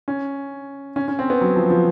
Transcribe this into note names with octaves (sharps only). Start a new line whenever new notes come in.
C#4
C#4
C#4
C4
B3
F#3
F3
F3